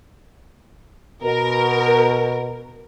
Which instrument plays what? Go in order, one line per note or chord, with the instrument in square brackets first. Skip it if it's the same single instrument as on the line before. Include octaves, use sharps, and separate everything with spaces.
[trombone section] B2 [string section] A#4